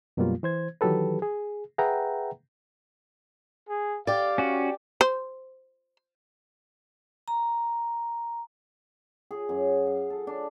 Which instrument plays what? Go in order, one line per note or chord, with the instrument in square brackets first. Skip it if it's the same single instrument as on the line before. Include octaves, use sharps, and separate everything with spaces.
[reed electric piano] F#2 B2 F#3 G3 A#3 F4
E3 C5 G#6
D#3 E3 F#3 G4 A4 B4
G#4
G#4 B4 E5 F#5 G5 A#5
[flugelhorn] G#4
[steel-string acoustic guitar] G4 D5 [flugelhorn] F5
[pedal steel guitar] C#4 F#4
[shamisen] C5
[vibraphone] A#5
[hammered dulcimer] G#4
F#2
F5
A4
D4